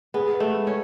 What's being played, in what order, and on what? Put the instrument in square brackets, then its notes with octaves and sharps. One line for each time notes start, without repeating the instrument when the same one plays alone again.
[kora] B3 [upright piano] G#4
[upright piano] B4
[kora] A3
[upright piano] G#3
[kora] C#4